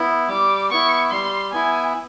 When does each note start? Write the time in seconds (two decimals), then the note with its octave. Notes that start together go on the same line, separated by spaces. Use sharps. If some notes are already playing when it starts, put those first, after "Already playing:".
Already playing: B3 E4
0.28 G3 D6
0.71 B3 E4 C#6
1.11 G3 C6
1.52 B3 E4 G#5